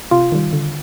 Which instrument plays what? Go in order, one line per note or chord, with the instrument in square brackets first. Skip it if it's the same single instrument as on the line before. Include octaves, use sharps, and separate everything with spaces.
[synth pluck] C3 F4
D#3 G3
D3